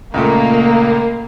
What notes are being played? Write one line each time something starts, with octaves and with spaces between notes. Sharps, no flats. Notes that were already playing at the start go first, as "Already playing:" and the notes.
C#2 A#2 A3 A#3